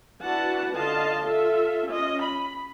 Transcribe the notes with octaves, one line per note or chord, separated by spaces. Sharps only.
D4 E4 F#4 B4 F#5 A5
D3 F4 D#5 F5 A5 C6
F4 A4 E5
C#4 F4 D#5
B5